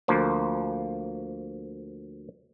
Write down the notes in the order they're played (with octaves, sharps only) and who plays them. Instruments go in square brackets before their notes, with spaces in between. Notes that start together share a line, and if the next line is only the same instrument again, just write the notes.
[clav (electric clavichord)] D2 F3 A#3